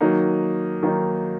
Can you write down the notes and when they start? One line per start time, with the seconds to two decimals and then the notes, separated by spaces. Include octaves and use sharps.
0.01 D#3 F#3 A#3 D#4
0.83 D#3 F#3 A#3 D#4